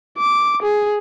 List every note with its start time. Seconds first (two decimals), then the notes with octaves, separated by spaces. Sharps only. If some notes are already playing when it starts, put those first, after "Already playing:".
0.18 D6
0.62 G#4